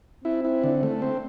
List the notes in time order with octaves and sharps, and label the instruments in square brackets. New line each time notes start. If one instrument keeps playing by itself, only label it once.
[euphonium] C4 [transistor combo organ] E4
[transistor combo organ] E4
D3
A3
C4